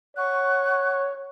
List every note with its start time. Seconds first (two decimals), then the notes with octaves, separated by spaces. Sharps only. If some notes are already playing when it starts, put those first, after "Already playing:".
0.17 C#5 F#5 C#6 F#6